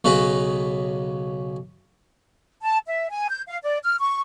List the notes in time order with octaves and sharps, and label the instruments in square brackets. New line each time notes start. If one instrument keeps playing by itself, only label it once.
[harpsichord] B1 C#3 C#4 B4 D#5
[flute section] A5
E5
G#5
G6
F5
D5
F6
C#6